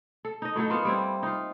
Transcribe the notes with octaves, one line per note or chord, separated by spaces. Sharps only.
A4
D#4 D#5
A2 F#3 D#4 A4
A#3 B3 F4
G3 C4 E4
D#4 F4